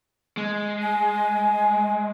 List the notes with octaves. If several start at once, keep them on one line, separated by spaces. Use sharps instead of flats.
G#3
G#5